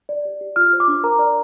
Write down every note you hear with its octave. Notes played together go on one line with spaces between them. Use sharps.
D5
G4
G4
F4 F6
C5
D6
D4
A#4 A#5
D5